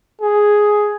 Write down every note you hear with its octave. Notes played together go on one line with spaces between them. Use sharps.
G#4